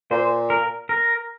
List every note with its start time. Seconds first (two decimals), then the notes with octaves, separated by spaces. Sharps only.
0.11 A#2 C5
0.50 A#4
0.89 A#4